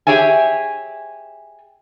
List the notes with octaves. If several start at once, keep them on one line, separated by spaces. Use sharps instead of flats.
G4 G#4 C#5 E5 G#5